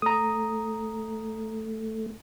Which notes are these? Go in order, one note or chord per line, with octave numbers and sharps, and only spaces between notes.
A3 A#5 D#6